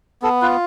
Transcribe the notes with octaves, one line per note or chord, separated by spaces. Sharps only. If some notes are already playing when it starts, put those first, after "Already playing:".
B3 A4
F4 B4